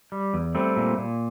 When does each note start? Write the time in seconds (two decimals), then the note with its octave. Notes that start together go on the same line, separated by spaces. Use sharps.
0.12 G3
0.34 E2
0.55 G3 A3 C4
0.77 A#2
0.98 A#2